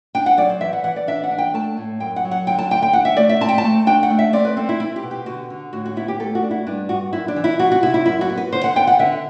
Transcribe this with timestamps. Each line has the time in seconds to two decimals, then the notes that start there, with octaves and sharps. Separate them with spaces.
0.15 D4 G5
0.26 F#5
0.37 F#3 D5
0.49 C5
0.61 E3 E5
0.73 F#5
0.84 E3 F#5
0.96 D5
1.07 D4 E5
1.23 F#5
1.31 D4
1.38 G5
1.54 A3 A5
1.77 A2
2.00 F#2 G5
2.16 F#5
2.25 F#3
2.31 F#5
2.47 D3 G5
2.58 A5
2.70 D2 G5
2.82 G5
2.93 D4 F#5
3.05 E5
3.17 A3 D5
3.29 E5
3.40 C4 A5
3.49 G5
3.58 A5
3.64 A3
3.87 D4 G5
4.03 F#5
4.10 A3
4.19 E5
4.33 C4 D5
4.45 B4
4.57 C4 A4
4.69 E4
4.80 C4 E4
4.96 G4
5.03 B2
5.11 G4
5.26 D3 F#4
5.50 D3
5.73 A2 F#4
5.86 F#4
5.96 B3 E4
6.08 G4
6.20 A3 A4
6.35 F#4
6.43 D4
6.51 E4
6.66 G2 D4
6.89 G2 F#4
7.13 F#2 E4
7.28 D4
7.36 E3
7.44 E4
7.59 C4 F#4
7.72 F#4
7.83 C3 E4
7.94 E4
8.06 F#2 E4
8.21 F#4
8.29 B3
8.38 B4
8.52 D3 C5
8.64 F#5
8.75 B3 G5
8.87 F#5
8.99 D3 E5